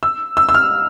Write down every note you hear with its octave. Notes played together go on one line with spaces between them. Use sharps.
E6
E6
E6
F6